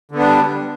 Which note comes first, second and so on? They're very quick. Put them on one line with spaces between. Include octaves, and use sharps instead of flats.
D3 B3 D4 G3